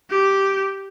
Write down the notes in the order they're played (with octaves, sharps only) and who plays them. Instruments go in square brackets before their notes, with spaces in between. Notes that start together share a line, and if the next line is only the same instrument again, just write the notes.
[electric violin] G4